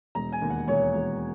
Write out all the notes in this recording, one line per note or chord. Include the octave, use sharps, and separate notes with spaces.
E1 A#5
G#5
D#2
F#5
E1 C#5
E1